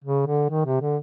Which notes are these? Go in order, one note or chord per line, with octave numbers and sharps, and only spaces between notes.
C#3
D3
D#3
C3
D3